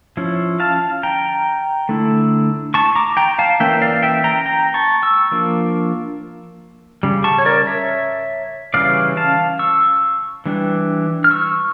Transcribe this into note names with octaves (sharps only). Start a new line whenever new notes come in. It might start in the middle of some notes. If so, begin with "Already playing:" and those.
F3 C#4 E4
F5 A5
G5 A#5
D3 A3 E4
A5 C#6
A#5 D6
G5 A#5
F5 A5
E3 A#3 C#4 E4 E5 G5
D5 F5
E5 G5
G5 A#5
G5 A#5
A5 C#6
C#6 E6
F3 A#3 D4
C#3 G3
A5 C#6
C#5
A#4 D5
C#5 E5
C#3 E3 G3 C#4 D5 F5
F5 A5
C#6 E6
E3 G3 D4
F6
C#6 E6